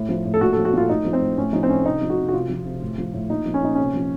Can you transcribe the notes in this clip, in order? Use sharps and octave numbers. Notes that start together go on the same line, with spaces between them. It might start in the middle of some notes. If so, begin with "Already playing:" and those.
Already playing: A2
F3
A2
A4
A#2 F#4
A4
F3
F#4
A#2 F4
A2 D#4
F3
C4
A2
A2 C#4
F3 D#4
C4
A2 C#4
C3 D#4
F3
F#4
C3
F#4
C3 F4
F3
C3
A2
F3
A2
A#2 D#4
F3
C#4
A#2 D#4
C3 C#4
F3